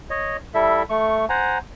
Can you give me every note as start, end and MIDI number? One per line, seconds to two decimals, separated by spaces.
0.10 0.37 73
0.10 0.37 75
0.54 0.83 55
0.54 0.83 64
0.54 0.83 69
0.54 0.83 76
0.90 1.26 57
0.90 1.26 85
1.29 1.58 72
1.29 1.58 78
1.29 1.58 80
1.29 1.58 82